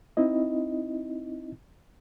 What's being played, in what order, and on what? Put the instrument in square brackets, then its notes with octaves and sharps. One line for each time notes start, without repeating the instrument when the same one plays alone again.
[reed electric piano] C4 D#4 E4 D#5